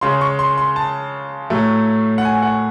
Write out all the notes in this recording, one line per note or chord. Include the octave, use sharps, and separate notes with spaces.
C#3 G#3 C6
C#6
C6
C6
A5
A2 F#3 A3
F#5
G#5
F#5